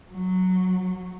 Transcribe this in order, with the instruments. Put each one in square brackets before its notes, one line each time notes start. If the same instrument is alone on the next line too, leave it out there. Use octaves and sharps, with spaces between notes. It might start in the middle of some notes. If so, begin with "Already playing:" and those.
[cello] F#3